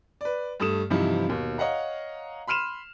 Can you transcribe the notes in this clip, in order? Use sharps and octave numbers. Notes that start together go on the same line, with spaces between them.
B4 D5
G2 A3 D#6 E7
G2 C3 E3 F3 D#4 E4
D#2 B2
C#5 D#5 F5 F#5 A#5
B5 C6 F6 D#7 E7